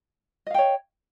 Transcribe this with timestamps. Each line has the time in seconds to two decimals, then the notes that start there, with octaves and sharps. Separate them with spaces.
0.47 D#5
0.50 F5
0.54 G5
0.58 C#5